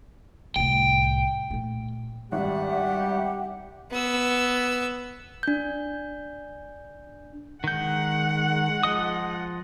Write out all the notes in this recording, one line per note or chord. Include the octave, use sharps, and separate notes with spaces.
C2 A2 G5
A#2 A3
G#1 G2 G3 G4 E5 F#5
B3 E6
D4 G6
D#3 G#3 F#5 G6
F3 D#5 D#6